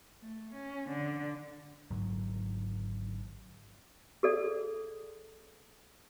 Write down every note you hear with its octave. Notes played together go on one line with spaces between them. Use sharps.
A3
C#4
D3
G#1 G#2 D3 F#3
G#4 A4 D5